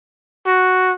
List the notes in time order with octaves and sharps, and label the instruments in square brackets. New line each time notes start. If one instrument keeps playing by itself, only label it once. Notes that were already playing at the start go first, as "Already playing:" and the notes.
[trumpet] F#4